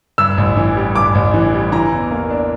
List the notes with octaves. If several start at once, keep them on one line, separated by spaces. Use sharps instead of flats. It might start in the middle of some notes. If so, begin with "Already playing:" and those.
G2 E6
A1
E3
G3
G2 D6
A1
E3
G3
E3 A#5
E2
A#3
D4